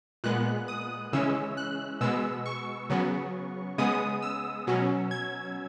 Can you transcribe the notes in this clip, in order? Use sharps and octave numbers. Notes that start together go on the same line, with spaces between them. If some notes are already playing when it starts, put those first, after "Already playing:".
A#2 G#3 B3 F#6
D#6
C#3 E3 G#3 C#4 E6
F#6
B2 G#3 B3 E6
C#6
C#3 F#3 B3
C#3 G#3 B3 D#6
E6
B2 F#3 C#4
G#6